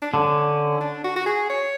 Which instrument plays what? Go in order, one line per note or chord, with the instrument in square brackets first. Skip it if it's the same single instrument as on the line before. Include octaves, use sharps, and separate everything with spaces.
[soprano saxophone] D4
[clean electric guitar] D3 [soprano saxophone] C#4
[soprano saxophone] D4
F#4
F#4
G#4
C#5